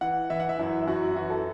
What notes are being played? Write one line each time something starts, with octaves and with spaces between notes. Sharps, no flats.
E3 F#5
E3 E5
F#5
E5
F#2 E4
F#2 F#4
E4
E3 F#4
A4